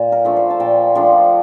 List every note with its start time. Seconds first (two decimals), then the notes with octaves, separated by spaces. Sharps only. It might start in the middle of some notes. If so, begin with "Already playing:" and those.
Already playing: A#2
0.12 A#4
0.25 F3 A3 D4
0.36 C5
0.50 A5
0.60 A#2 G5
0.95 F3 A3 D4